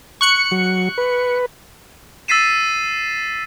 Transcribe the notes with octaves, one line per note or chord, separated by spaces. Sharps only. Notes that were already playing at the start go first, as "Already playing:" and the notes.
C#6 F#6 C#7
F#3
B4
E6 A6 B6 C7 D#7 E7